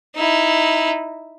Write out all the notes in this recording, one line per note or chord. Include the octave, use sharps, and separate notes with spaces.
D#4 E4